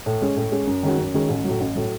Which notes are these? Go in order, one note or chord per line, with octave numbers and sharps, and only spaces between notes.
A2
G#3 C#4
A2
G#3 C#4
F#2
D#3 G#3 C#4 F#4
F#2
D#3 G#3 C#4 F#4
A1
F#3
A2
A1
A2 F#3